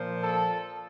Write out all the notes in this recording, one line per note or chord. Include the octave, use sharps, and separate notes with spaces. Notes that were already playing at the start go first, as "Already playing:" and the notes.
Already playing: A#2 F3
A4